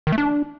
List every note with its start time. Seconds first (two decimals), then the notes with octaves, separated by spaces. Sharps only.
0.07 D#3
0.12 A3
0.18 D4